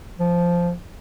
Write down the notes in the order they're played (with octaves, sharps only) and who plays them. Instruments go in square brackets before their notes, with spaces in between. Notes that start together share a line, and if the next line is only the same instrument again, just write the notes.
[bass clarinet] F3